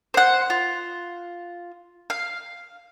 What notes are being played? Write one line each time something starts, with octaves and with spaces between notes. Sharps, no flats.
C5 F#5
F4
F5